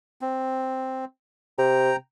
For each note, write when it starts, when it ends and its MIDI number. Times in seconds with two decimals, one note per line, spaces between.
0.21 1.05 60
1.58 1.92 48
1.58 1.96 79
1.58 1.96 82